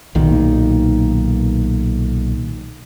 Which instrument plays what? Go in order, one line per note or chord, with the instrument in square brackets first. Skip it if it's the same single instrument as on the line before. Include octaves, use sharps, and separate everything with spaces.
[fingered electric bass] B1 A#2 D#3